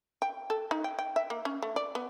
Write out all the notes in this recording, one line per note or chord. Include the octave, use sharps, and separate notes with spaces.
G5
A4
D#4
G5
G5
E5
A#3
C#4
A3
D5
B3